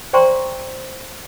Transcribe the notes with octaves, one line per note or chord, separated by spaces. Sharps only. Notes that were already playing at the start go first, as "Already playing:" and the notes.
C5 D5 G5 A#5 C6 C#6